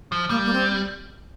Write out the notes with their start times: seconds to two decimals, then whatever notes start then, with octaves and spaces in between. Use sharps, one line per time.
0.12 F3
0.30 G3 A#3
0.45 A#3
0.53 C4